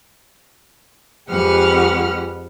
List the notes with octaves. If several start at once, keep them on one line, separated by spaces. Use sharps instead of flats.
F2 G#3 G4 B4 F#5 F6